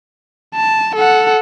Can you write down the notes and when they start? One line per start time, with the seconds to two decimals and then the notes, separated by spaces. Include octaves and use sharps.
0.55 A5
0.96 A4 F#5